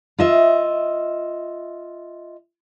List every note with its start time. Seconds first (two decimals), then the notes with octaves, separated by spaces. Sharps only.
0.18 F4 D#5 E5